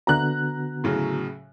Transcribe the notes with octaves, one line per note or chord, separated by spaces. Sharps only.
D3 B3 F#4 A#5 F#6
A2 C#3 F#3